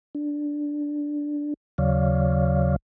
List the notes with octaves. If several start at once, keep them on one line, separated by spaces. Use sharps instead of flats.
D4
D#2 C#3 F#3 C#5 D5 F5